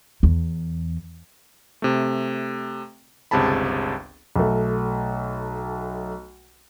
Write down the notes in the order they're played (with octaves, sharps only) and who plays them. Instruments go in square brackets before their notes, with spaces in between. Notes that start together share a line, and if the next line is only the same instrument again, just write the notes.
[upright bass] E2
[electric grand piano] C3 A3
G1 C#2 C3 G#4 A5 B5
[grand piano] B1 A3